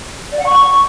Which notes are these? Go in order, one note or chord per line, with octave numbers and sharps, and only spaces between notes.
D5
F#5
C#6